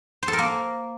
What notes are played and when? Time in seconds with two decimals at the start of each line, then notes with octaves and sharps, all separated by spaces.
0.23 C5
0.28 A4
0.33 A#4
0.39 A#3